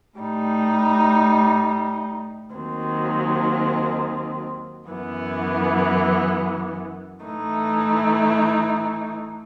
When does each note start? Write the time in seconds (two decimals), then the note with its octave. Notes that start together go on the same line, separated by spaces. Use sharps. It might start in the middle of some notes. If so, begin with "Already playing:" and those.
0.19 A2 G3 D#4
2.54 D#2 D#3 F#3 C4
4.89 F#2 E3 B3
7.24 A2 E3 A3 D#4